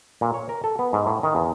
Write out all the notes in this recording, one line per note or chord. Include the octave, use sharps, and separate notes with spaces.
A#2
C#5
A#4
A4
B3
G#2
A2
D#3
E2